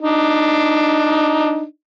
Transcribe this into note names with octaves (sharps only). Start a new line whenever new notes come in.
D4 D#4